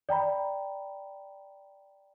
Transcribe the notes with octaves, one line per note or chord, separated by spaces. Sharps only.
D5 G5 A#5 B5